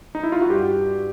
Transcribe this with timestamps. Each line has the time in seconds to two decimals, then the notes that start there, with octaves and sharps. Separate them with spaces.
0.15 D#4
0.23 E4
0.32 F4
0.42 F#4
0.50 G2 G4